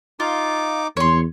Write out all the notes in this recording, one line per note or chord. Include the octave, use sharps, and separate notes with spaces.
D#4 F4 D6
E2 C#5 C6